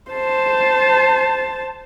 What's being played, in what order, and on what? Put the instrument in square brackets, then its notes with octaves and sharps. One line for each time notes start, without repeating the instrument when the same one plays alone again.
[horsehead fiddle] C5 A5